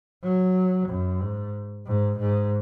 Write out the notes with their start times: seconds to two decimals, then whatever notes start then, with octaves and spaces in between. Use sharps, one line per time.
0.24 F#3
0.89 F#2
1.21 G#2
1.87 G#2
2.19 G#2